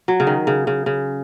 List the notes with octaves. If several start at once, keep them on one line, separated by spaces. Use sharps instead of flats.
F#3
C#3
D#3
C#3
C#3
C#3